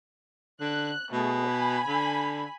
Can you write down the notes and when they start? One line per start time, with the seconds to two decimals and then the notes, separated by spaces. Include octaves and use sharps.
0.60 D3 F#6
1.13 B2 A3 G#4
1.46 G#5 B5
1.87 D3